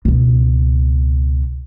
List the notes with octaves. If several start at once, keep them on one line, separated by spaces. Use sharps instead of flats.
C#2 B2